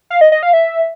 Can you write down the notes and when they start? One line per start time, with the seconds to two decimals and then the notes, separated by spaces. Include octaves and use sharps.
0.10 F5
0.21 D#5
0.32 D#5
0.43 F5
0.53 E5